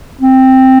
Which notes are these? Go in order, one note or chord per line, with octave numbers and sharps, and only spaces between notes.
C4